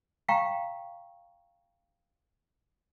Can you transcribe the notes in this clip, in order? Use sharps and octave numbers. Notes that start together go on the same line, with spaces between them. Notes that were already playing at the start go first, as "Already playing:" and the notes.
F5 G5 A#5 C#6